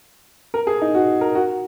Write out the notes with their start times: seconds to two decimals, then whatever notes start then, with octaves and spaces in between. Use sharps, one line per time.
0.54 A#4
0.67 G#4
0.82 D#4
0.95 F#4
1.21 A#4
1.35 F#4